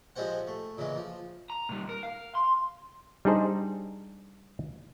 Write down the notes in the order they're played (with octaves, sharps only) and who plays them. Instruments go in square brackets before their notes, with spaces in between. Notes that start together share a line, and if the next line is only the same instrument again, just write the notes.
[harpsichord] F3 G3 G#3 C4 C5 F#5
A3
A#2 C#3 E3 G#3
F3
[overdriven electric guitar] A#5
A#2 G3
A#4
F5
C6
[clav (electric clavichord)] G3 D4 D#4 G#4 C5 D#5